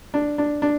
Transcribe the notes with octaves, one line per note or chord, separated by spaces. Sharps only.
D4
D4
D4